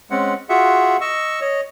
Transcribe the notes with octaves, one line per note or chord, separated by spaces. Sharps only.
G#3 C4 C#4 F#5
F4 F#4 G#4 E5 F#5
D#5 C#6 E6
C#5 D#5